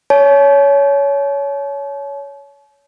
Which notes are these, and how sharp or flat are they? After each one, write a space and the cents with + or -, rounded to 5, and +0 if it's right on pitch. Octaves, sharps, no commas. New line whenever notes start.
C#5 +20 A5 -45